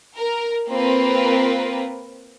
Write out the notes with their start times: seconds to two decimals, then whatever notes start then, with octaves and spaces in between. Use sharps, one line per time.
0.16 A#4
0.69 A#3 C4 F4 A#4 B4